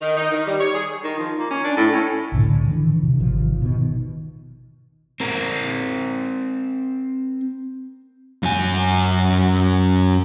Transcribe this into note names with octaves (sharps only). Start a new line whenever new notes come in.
D#3
D#4
D#3
G3
C#5
G#4
D#3
F3
A#3
C#4
D4
A2
C#4
C2 A2 D3
D#3 E3 D4
C3
G#1 C3 D#3 F3
B2 D#3
C4 A#4
F#2 G#5